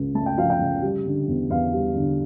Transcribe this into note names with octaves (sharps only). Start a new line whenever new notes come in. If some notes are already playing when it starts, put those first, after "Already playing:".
Already playing: C#2 C#3
A3 A5
G5
F3 F5
G5
C#3
G3
D3
E2
E2 F5
G3
D3